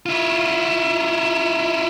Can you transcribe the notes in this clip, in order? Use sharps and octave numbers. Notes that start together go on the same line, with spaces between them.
E4 F4